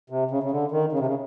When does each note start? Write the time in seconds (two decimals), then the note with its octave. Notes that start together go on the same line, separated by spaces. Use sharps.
0.10 C3
0.31 C#3
0.43 C#3
0.51 D3
0.71 D#3
0.92 C#3
0.99 C3
1.06 C#3